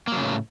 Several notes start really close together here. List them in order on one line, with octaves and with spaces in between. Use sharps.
A#3 F#3 C#3 A2